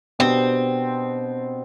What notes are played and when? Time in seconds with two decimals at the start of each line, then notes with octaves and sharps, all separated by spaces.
0.19 B2 B3 C4 D4 G4